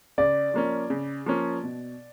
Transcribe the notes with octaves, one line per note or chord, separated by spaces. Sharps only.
C#3 D5
F3 A#3 C#4
C#3
F3 A#3 C#4
B2